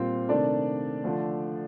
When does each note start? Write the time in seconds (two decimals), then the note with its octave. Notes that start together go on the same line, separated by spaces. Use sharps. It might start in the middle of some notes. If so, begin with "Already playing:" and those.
Already playing: A#2 G3 C4 F4 C5
0.28 C3 D#3 A3 D4 D5
1.04 D3 F3 A3